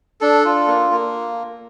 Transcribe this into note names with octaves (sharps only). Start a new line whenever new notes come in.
D4 A4
F4
A#3
A#3